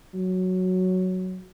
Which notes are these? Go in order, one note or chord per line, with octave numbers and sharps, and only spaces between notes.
F#3